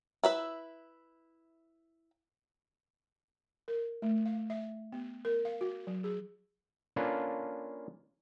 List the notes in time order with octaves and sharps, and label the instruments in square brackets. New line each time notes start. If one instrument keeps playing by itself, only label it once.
[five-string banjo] E4 B4 E5
[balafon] A#4
A3
F5
E5
B3
A#4
F5
F#4
F#3
G#4
[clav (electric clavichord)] A#3 C#4 D4 F4 A4 B4